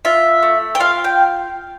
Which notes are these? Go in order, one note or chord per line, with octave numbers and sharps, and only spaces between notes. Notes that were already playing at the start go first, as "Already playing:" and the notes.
F4 E5
A3
G5
F4 F5
G5